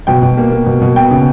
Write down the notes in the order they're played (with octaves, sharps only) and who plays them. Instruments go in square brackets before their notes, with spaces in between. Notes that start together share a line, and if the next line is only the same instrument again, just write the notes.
[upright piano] B2 G5
B2
A#3
A#3
B2
B2
B3 G5
C#3